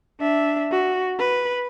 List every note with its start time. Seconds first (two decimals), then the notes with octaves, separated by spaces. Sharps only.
0.20 D4 E5
0.72 F#4
1.19 B4